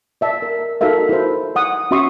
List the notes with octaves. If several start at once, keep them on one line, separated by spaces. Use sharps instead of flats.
D5 E5 A5
A#4
D#4 F#4 A4 A#4 E5 F5
E4 C5
E5 F#5 D#6
C#4 F#4 E5 C6 C#6 D#6